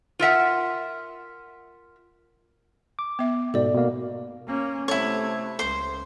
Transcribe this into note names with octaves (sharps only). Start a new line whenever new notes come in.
F4 A#4 E5 F#5
D6
B3 E5
G#2 B2 A4 D5
B2 A#3
A#3 C#4
C3 A3 E4 C#5
C#2 C5